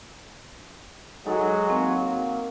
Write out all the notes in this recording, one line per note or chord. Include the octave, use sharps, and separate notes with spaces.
F#3 G#3 D#4 A4
A#3 C4 C#6